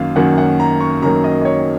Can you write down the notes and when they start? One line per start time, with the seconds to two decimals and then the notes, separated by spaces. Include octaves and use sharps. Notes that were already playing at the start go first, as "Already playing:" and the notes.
Already playing: F#2 D#3 F#3 A#3 F5
0.16 F#2 D#3 F#3 A#3 F#5
0.38 F#5
0.60 A#5
0.80 C#6
1.02 F#2 D#3 F#3 A#3 A#5
1.24 D#5
1.41 D#5
1.45 C#5